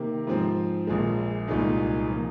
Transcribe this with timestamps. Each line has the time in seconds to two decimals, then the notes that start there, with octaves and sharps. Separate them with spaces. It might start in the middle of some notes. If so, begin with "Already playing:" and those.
Already playing: C3 D#3 A#3
0.27 G#2 F3 C4
0.87 A#1 A#2 G#3
1.48 C2 A#2 G#3 D#4 G#4
2.11 F3 A#3